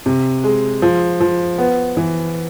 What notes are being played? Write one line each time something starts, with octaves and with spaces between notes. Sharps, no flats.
C3
G#3
F3
F3
B3
E3